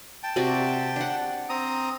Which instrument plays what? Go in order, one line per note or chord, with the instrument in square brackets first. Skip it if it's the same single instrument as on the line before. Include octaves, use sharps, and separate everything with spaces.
[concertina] G5 A5
[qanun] C3 F#4 D5
D4 F#5
[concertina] C4 A#5 D#6